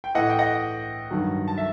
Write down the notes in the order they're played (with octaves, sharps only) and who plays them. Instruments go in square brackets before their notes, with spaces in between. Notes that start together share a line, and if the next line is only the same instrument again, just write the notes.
[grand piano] G5
A2 E3 D#5 F#5
G5
D#5 F#5
G2 D#3 F#3
A5
E5